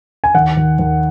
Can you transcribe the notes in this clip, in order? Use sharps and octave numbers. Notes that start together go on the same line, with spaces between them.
G#5
D#2 F#5
D#2
D#2